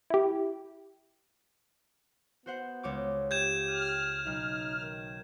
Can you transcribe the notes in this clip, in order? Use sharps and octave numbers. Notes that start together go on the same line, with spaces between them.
E4 G4
B3 F#4 C5 F#5
C#2 C#5 D6
G4 G6 G#6 E7
F6 D#7
B1 D#4
D#3